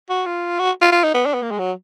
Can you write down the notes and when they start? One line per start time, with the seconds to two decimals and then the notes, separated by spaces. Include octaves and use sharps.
0.09 F#4
0.26 F4
0.59 F#4
0.81 F4
0.92 F4
1.04 D#4
1.14 B3
1.26 D4
1.34 B3
1.42 A#3
1.51 G#3
1.59 F#3